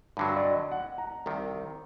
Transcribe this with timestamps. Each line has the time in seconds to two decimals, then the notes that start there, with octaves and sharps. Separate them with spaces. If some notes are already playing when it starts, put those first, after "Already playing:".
0.17 G2 D3 F#3
0.36 D5
0.44 D#5
0.71 F#5
0.98 A#5
1.26 C2 C3 D#3